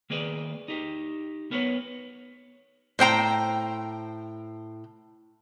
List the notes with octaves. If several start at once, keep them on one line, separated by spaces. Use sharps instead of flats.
D#3 A#3 G#4 B4 D5
D#4 G4
B3 A#4 B4 C#5
A2 C5 G5 A#5